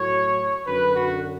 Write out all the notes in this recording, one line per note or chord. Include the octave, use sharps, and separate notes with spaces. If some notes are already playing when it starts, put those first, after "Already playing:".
Already playing: A2 F#3 C#5
F#2 D3 F#3 B4
F#4